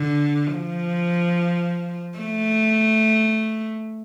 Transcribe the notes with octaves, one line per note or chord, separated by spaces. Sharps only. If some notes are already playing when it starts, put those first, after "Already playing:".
Already playing: D3
F3
A3